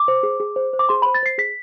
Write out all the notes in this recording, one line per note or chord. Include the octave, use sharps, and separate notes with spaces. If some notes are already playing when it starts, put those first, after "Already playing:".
Already playing: D6
C5
G#4
G#4
C5
C5
D6
G#4 C6
C5 B5
A6
C5 C7
G#4 B6